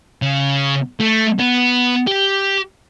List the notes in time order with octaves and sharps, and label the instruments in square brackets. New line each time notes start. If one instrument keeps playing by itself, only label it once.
[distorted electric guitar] C#3
A3
B3
G4